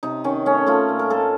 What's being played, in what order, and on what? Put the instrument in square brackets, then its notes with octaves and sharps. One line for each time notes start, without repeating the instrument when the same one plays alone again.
[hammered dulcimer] C3 D#4
D#3 C#4
A3 C#4
A3 F4
A#2
A#4
A#3 A4